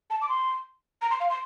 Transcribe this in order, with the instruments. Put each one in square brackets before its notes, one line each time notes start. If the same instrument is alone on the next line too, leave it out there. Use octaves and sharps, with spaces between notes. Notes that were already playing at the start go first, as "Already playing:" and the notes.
[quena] A5
D6
C6
A#5
C6
F5
C6